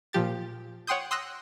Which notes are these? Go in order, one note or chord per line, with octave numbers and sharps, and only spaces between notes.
A#2 F3 G4 A6
C#5 F#5 G5 C6 D#6 G6
C6 D#6 E6 F#6 A#6